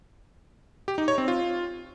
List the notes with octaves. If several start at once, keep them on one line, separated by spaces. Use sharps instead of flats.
G4
D#4
C#5
C4
F4